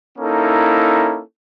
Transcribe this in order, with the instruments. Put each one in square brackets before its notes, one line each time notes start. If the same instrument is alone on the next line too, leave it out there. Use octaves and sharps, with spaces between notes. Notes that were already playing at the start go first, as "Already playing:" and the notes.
[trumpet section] A#3 C#4 D#4 E4 A4